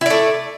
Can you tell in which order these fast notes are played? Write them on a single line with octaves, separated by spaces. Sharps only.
E4 D5 A3